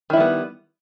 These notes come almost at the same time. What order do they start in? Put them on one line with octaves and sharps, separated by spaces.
D#3 E4 G3 B3